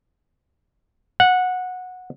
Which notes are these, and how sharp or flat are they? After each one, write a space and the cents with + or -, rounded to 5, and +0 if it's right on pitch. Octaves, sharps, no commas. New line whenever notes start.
F#5 -15